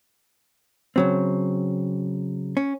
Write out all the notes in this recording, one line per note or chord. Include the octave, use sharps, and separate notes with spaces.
C#3 F#3 C4
C#4